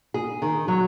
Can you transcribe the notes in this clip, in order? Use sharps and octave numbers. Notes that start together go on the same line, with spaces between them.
G#4
D#3
F#3